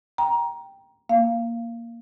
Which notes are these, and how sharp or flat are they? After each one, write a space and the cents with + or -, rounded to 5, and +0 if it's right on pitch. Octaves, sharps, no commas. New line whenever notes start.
G5 +0 A#5 +15
A#3 +0 F5 -20